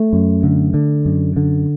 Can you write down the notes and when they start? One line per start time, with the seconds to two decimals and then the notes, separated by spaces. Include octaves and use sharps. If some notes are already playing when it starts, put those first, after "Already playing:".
Already playing: A3
0.13 F#2
0.43 D3
0.74 D3
1.05 F#2
1.36 D3